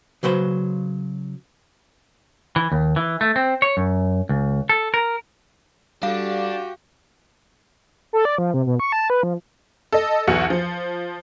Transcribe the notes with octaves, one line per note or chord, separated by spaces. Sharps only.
C#3 F#3 B4 C5
E3
D#2
E3
A3
C4
C#5
F#2
C#2
A4
A#4
G3 D4 F#4 G4 A4 F5
A4
D5
F3
C3
B2
C#6
A5
B4
F3
A4 D#5
B1 E2 F#4 C#7
F3